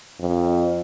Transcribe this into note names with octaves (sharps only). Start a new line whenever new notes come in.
F2